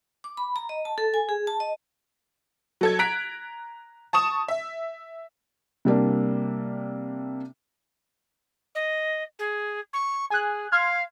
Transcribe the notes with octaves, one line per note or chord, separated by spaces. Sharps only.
D6
B5
A#5
D#5
A5
A4
G#5
G#4
A5
D#5
F#3 A4 G#6
A#5 F#6 B6 D7
A5 C#6 D#6 E7
E5
C3 G3 A#3 D4
D#5
G#4
C#6
G#4 G#5 F#6
F5 C6 F6 G#6